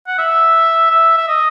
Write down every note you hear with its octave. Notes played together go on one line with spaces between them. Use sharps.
F#5
E5
E5
E5
D#5